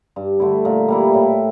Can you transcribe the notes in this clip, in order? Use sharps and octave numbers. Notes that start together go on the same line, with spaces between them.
G2
D3 A3 E4
A#2
G3 A#3 E4
A2